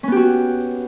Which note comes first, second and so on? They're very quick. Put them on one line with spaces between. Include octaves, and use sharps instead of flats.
C#4 B3 G4 F#4